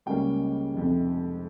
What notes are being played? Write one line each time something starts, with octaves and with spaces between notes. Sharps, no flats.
C#2 C#3 G3 A#3 C#4 G5
F1 F2 C3